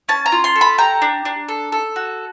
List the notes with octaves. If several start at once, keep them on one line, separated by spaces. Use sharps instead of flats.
C#4 A5
A#5
F4
C6
A4
B5
G4 A#5
D4
D4
A4
A4
F#4